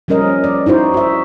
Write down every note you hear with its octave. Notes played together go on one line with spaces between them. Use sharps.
F3 G3 C#4 A#4 D#5
D5
D#4 E4 F#4 C5
F#4 E5